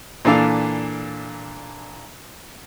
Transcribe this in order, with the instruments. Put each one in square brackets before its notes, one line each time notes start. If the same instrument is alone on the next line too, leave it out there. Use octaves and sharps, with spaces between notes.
[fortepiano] A#2 E3 D4 A4 F5